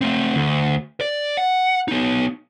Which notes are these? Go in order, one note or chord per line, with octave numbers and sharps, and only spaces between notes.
A3 C4
D2
D5
F#5
B3 D#4